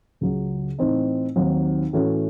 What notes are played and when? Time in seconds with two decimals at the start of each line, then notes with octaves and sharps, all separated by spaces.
0.21 C#2 C#3 F#3
0.79 A2 E3 C4 D#4
1.36 D#2 D#3 F#3 C4
1.93 A2 E3 A3 C#4 F#4